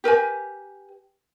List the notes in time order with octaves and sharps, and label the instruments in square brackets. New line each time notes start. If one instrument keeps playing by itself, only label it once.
[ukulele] G4 A#4 B4 G#5